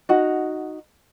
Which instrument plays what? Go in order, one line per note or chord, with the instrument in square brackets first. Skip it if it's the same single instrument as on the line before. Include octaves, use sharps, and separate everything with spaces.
[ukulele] D#4 F#4 F#5